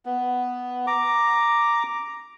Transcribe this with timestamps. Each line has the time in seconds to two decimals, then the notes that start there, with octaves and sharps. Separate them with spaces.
0.06 B3
0.87 A#5 D6